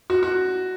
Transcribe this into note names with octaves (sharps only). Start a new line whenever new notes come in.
F#4
F#4